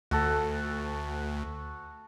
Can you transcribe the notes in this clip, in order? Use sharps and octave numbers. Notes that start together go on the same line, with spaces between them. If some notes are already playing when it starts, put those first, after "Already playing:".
D2 F#4 A4